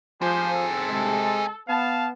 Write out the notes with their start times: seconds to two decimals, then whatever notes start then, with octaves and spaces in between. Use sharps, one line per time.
0.22 F3 C4 G4 G#4 C5
0.53 A4
0.89 C3 G#3
1.68 B3 F5 A5